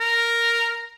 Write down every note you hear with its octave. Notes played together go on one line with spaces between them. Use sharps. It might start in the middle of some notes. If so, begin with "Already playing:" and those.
A#4